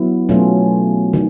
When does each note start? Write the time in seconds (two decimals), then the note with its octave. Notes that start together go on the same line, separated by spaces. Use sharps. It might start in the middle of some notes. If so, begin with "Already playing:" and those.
Already playing: F#3 B3 E4
0.29 B2 F#3 A3 C#4 F4
1.13 D#3